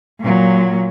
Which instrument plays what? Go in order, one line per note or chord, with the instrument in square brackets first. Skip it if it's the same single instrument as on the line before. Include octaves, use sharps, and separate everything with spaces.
[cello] A#2 F#3